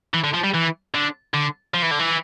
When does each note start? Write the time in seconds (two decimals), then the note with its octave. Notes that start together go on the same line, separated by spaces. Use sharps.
0.14 E3
0.24 D3
0.34 F3
0.44 G3
0.54 E3
0.94 D3
1.34 D3
1.74 F3
1.83 E3
1.91 D3
1.99 E3